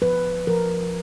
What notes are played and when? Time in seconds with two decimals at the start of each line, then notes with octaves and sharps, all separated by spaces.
0.02 F3 B4
0.47 F3 A#4